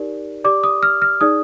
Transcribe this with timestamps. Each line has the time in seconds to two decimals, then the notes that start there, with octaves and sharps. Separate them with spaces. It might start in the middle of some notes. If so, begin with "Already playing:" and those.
Already playing: D#4 G4 A#4 D5
0.44 G4 D5 D6
0.64 D#6
0.83 F6
1.02 F6
1.21 D#4 G#4 D5 D#6